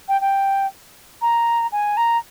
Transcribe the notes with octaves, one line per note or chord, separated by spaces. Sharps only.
G5
G5
A#5
G#5
A#5